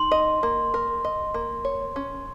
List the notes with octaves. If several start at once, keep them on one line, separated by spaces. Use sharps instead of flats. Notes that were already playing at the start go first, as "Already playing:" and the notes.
Already playing: D#4 C6
D#5
A#3
A#4
D#5
A#3
C#5
C#4